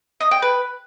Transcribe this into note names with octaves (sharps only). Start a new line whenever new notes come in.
D#5
G5
B4